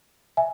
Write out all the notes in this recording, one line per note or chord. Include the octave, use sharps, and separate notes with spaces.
E5 G#5